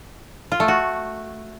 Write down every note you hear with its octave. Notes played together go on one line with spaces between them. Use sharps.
F4
A3
F#4